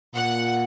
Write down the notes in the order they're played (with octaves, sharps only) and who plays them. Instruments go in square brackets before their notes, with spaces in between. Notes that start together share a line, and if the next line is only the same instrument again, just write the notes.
[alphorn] A#2 [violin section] F#5